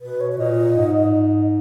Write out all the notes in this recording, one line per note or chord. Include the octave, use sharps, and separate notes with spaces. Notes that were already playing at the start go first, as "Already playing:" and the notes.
B2 B4
C#5
C#5
A#2 D#5
G#2